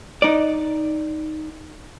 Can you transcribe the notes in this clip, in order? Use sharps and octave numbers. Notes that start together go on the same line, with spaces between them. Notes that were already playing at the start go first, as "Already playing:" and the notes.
D#4 D5